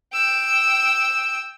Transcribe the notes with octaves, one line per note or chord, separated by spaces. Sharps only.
G5 E6